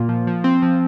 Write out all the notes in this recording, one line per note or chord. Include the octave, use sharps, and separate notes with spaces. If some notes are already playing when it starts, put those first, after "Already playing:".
Already playing: A#2 A#3 F4
F3
F3
C4
F3